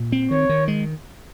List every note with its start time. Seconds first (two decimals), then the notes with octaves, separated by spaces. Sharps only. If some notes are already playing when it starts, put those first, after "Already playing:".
Already playing: A#2
0.12 C4
0.31 D#3 C#5
0.49 D#3
0.68 G#3